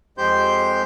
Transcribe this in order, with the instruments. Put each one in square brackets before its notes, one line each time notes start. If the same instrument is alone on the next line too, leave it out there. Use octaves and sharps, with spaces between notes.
[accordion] F2 G#3 G4 C5 C6 G6